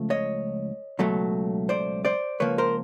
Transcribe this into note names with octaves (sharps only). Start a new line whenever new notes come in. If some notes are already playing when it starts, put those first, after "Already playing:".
Already playing: C#2 C#3 F3 A3
C#5 D#5
C#2 B2 F#3 A3
C5 D5
C5 D5
C#2 C#3 F3 A#3 B4 C#5
A#4 C5